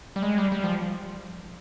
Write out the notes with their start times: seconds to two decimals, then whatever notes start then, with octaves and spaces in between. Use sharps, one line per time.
0.16 G3
0.23 G#3
0.38 G3
0.52 G3
0.64 F3